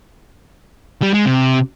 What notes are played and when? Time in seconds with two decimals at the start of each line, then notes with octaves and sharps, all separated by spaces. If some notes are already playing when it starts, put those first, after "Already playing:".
1.02 G3
1.14 G#3
1.25 C3